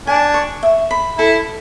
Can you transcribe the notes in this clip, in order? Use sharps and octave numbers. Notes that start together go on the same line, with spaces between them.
D4 G#5
C#6
E5
B5
E4 A4